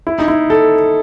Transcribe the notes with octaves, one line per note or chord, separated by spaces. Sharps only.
E4
D#4
E4
A4